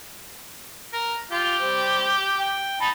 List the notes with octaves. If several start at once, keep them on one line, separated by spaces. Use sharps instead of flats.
A#4
F4 G4
G3 C4
G5
D#4 A5 B5